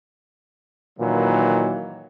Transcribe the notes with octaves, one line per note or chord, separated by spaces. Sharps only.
A#2 D#3 E3 F#3